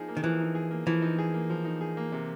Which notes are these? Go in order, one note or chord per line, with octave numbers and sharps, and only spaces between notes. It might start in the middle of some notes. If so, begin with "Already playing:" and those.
Already playing: F3 D#4 G#4
A#3
D#3
E3 F3
D#4
G#4
A#3
E3 F3
D#4
G#4
A#3
F3
D#4
G#4
A#3
C3